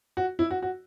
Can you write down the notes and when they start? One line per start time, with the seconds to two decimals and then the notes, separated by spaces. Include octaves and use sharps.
0.17 F#4
0.39 E4
0.51 F#4
0.62 F#4